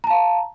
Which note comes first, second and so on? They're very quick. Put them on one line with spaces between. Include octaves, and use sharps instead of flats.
A#5 A5 F5